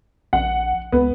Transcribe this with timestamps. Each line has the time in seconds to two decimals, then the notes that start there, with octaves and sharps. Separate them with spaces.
0.33 A#1 F#5
0.92 C#2 B3